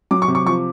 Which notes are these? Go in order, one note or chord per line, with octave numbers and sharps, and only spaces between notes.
F#3 D6
C#6
C3
C#6
F3 C#6